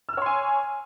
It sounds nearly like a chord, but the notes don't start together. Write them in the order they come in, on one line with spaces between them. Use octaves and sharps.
E6 F6 C#5 C6 G#5